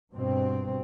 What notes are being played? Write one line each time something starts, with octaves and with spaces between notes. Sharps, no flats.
G2 B2 C4